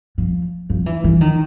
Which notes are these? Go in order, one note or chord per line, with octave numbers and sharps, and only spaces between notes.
F3
F3
E3
E3
D#3